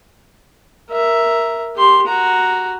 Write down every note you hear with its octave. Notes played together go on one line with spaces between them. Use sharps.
A#4 E5
G4 C6
F#4 A#5